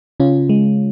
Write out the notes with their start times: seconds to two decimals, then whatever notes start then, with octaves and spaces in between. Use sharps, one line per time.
0.20 C#3 C#4 F4
0.49 G#3